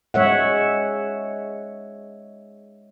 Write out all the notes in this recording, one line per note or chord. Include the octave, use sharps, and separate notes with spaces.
G#3 C#5 E5 F#5